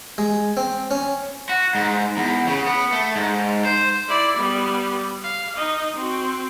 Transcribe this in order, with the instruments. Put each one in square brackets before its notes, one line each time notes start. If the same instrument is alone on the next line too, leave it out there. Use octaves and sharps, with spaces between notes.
[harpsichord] G#3
C4
C#4
[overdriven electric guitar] F#4
G#2
E2
C#3
B3
A3
G#2
C5
[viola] E4 D5
G3 B3
F5
D#4 D#5
C4 F#4